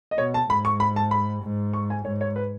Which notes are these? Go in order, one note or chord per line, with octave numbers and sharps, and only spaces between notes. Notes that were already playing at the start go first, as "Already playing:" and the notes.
D#5
B2 C#5
A5
G#2 B5
C#6
B5
A5
B5
G#2
C#6
G#5
G#2 C#5
C#5
B4